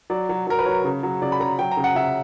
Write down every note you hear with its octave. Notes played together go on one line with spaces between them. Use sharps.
F#3 D5
F#3
F#3 A#4
B4
F#3 C#5
C#3
F#3
C#3 D5
B5
C#3 A#5
F#3 G5
A#5
C#3
F#5
C#3 E5